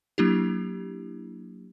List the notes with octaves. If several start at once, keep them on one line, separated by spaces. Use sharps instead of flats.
F#3 A#3 D4 E4 G4